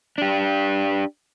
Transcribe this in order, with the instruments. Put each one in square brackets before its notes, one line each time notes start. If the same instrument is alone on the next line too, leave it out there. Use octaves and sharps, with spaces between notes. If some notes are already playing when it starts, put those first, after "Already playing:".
[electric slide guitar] D4 G4